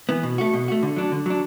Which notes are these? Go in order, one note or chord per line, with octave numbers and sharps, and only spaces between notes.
E3 B3
B2
A3 F#4
B2
A3 F#4
D3
F#3 D4
D3
F#3 D4